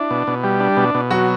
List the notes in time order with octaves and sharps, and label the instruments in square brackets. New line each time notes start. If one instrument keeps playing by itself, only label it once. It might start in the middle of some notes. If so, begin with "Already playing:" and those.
Already playing: [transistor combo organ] D4 [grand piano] E4
[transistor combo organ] B2
B2
G3
D4
B2
B2
[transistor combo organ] F#3 [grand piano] F#4